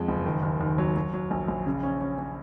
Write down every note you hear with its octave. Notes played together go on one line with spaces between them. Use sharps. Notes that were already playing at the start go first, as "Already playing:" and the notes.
Already playing: F2 F3 G#3
F#1
D#3
D#2
D#2
F#3
F#3
F#3
A#1
A#1
C#3
C#4
C#4
C#4